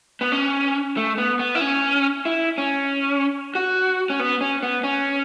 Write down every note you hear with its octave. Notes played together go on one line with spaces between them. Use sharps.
B3
C#4
A3
B3
B3
E4
C#4
E4
C#4
F#4
C#4
B3
C#4
B3
C#4